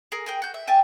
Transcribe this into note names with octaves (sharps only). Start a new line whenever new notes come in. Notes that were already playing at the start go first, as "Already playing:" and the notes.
G#4 A#4
G#4 A#4 G5
F#4 G6
E5
G4 E5 G#5 A5